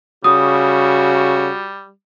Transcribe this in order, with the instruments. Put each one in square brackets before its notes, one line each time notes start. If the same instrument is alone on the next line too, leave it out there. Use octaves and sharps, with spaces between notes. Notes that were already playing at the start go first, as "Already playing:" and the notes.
[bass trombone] C#3 [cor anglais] G3 [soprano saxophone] F#4 [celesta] D#6